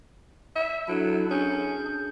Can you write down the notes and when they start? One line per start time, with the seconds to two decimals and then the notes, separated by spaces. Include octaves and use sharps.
0.56 E5
0.88 F#3 D4 E4 A4
1.30 C#4 D4 G#4 G6